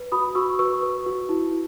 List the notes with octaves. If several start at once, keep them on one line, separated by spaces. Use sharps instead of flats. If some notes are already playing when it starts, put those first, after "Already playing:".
Already playing: B4
F#4 B5 D#6
F#4 C#6 E6
B4 C#6 E6
B4
F#4
E4